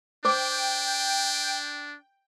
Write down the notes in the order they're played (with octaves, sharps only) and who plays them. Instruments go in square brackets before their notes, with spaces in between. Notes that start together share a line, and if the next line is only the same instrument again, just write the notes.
[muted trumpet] D4 [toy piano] C5 D6 [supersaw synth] G5